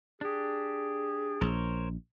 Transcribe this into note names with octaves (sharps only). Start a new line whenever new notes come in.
D4 G4 G#4
A#1 A#4 C5 C#5